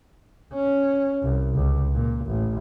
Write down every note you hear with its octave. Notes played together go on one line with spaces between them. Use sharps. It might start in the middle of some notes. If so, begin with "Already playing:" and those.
C#4
C2
C#2
A#2
A1